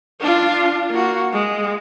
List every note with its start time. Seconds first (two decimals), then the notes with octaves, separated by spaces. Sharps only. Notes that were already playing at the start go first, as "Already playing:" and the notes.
0.21 D4 F4
0.90 A#3 F#4
1.32 G#3